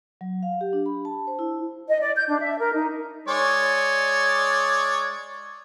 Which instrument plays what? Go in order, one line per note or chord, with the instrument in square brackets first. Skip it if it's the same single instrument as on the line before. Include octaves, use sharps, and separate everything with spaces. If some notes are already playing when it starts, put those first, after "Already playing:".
[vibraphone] F#3
F5
G4
D4
B5
A5
C5
E4
[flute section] D#5
D5
G6
D4
E5
A#4
D#4
[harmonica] G#3 C#5 D5